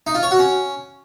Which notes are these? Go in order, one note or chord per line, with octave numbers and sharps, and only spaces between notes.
D#4
F4
C#5
F#4
C#4